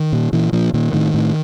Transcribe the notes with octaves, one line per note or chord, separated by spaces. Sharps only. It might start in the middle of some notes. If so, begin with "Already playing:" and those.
Already playing: D#3
A#2
A#2 E3
A#2 F3
A#2 D#3
A2 D#3
A2